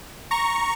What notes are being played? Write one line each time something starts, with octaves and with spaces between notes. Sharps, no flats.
A#5 C#6